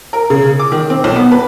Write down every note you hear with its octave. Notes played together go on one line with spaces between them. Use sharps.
A#4
C#3
D6
D#3
C4
B1
B3
B4